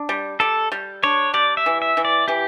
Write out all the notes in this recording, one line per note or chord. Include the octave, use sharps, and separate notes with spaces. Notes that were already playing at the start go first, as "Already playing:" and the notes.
Already playing: D4
G3
G3 A4
G3
D4 C#5
G3 D5
E5
E3
E5
E3
D5
E3 G4